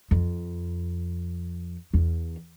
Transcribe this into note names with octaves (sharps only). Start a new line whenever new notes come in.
F2
E2